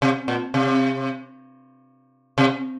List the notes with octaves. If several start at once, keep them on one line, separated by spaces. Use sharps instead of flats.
C3
A#2
C3
C3